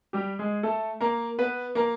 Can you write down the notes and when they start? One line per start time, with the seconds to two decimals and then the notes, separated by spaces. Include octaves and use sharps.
0.13 G3 G4
0.39 G#3 G#4
0.63 A3 A4
1.01 A#3 A#4
1.39 B3 B4
1.75 A#3 A#4